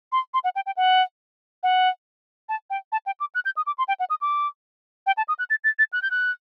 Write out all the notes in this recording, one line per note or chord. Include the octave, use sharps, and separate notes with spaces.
C6
C6
F#5
G5
G5
F#5
F#5
A5
G5
A5
G5
D6
F#6
G6
D#6
D6
C6
G5
F#5
D#6
D6
G5
A5
D#6
F#6
A6
A6
A6
F#6
G6
F#6